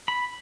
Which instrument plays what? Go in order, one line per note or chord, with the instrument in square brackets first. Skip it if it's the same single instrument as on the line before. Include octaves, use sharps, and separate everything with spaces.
[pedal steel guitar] B5